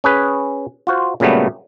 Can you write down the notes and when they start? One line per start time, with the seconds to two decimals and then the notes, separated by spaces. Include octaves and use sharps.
0.04 C#4 G#4 B4
0.87 F4 F#4 C5
1.20 A#2 C#3 F#3 G3 A3 B3